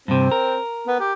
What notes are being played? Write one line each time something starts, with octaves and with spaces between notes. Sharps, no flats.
G2 C3 C4
A#4
B3
G4